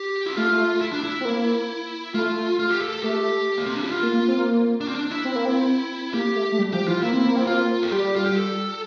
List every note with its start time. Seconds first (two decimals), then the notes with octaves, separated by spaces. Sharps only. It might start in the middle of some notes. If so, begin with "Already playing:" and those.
Already playing: G4
0.26 E4
0.37 A3 F4
0.81 E4
0.93 D4
1.04 E4
1.21 C4
1.25 A#3
2.14 A3 F4
2.59 F4
2.70 G4
2.81 A4
2.92 A4
3.03 A3 G4
3.58 A#3
3.67 C4
3.75 D4
3.83 E4
3.92 F4
4.02 A#3
4.14 A#3
4.28 C4
4.37 A#3
4.81 D4
4.88 C4
4.95 D4
5.10 E4
5.25 C4
5.35 A#3
5.45 C4
6.14 A#3 G4
6.36 A3
6.52 A3
6.59 G3
6.73 F3 G4
6.87 E3 F4
7.02 A#3 E4
7.13 C4
7.25 A#3
7.36 C4
7.47 A#3 F4
7.82 A4
7.91 G3 G4
8.16 F4
8.26 G4
8.36 A4